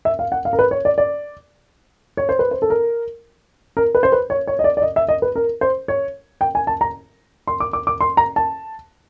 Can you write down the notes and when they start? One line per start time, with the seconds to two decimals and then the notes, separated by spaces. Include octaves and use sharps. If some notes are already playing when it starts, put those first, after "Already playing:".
0.05 E5
0.19 F5
0.32 F#5
0.45 F5
0.53 A#4
0.59 B4
0.71 C#5
0.85 D5
0.98 D5
2.17 C#5
2.29 C5
2.39 B4
2.51 C5
2.62 A4
2.70 A#4
3.77 A#4
3.95 B4
4.03 C5
4.12 B4
4.30 C#5
4.47 C#5
4.59 D#5
4.64 D5
4.77 D5
4.82 D#5
4.96 E5
5.08 D#5
5.22 B4
5.36 A#4
5.61 C5
5.88 C#5
6.41 G5
6.55 G#5
6.67 A5
6.81 A#5
7.47 C6
7.60 D6
7.73 D6
7.87 D6
8.01 C6
8.17 A#5
8.36 A5